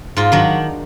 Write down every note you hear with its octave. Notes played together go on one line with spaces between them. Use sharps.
G#2 F4
D#3 F#3 D4